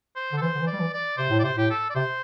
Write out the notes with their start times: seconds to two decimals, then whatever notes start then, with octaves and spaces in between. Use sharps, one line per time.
0.16 C5
0.32 D3
0.38 A4
0.41 E3 C5
0.55 D3
0.61 E3
0.67 D5
0.73 G3
0.80 E3
0.93 D5
1.18 C3 C5
1.30 A2
1.40 D5
1.44 C3 C5
1.57 A2 G4
1.70 A4
1.90 D5
1.95 C3 C5